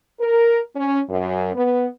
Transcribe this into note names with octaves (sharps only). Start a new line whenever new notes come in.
A#4
C#4
F#2
B3